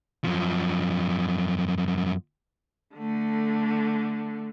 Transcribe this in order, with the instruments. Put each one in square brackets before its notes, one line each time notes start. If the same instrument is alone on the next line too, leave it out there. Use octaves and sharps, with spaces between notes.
[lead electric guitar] F#2 F3
[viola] D3 A3